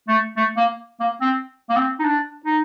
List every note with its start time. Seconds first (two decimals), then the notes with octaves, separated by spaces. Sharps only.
0.08 A3
0.37 A3
0.57 A#3
1.00 A#3
1.21 C4
1.70 A#3
1.76 C4
1.99 D#4
2.04 D4
2.45 D#4